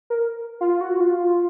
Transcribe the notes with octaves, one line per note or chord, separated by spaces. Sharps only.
A#4
F4
F#4
F4